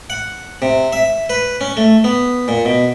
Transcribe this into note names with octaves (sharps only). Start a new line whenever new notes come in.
F#5
C3
E5
B4
C#4
A3
B3
A#2
B2